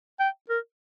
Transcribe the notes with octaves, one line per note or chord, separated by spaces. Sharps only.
G5
A#4